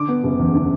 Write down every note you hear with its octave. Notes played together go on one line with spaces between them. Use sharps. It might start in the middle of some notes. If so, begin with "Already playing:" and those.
Already playing: D3 D6
B3
F#1
E2
D3